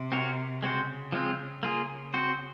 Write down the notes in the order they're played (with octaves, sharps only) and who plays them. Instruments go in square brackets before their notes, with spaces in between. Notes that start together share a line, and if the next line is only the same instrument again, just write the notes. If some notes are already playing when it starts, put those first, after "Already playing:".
Already playing: [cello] C3
[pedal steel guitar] C4 F#4 A#4 C#5
[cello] C#3 [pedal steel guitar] G#3 C4 F#4 C5
[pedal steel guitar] F3 G#3 C4 F4
[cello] C#3 [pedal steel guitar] A#3 F4 G#4
[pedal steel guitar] C4 F#4 C5